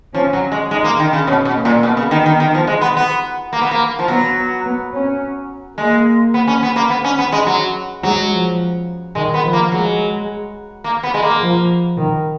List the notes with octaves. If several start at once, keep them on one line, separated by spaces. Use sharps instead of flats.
F3 C#4
F#3
G#3
G#3 D#4
A#3
D#3
C#3
B2 C#4
B2
A#3
A#2
B2 B3
C#3
D#3
D#3
D#3
F3
G#3
B3
B3
A#3
B3
A#3
F3
F#3 B3
B3
C#4
G#3 A#3
B3
C#4
B3
A#3
B3
C#4
B3
G#3
F#3
F#3 G#3
F3
D#3 G#3
B3
F3
A#3
F#3 G#3
A#3
B3
G#3
A#3
F3
D#3